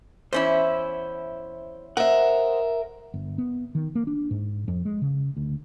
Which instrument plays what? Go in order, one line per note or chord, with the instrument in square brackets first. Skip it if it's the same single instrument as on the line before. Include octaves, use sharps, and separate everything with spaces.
[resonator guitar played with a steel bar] E2 C#4 E4 [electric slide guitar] C5
[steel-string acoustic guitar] A#4 E5 [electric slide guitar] C5 D#5 F#5
[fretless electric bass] G1
B3
D#3
A#3
D4
G#2
F2
G#3
C#3
D2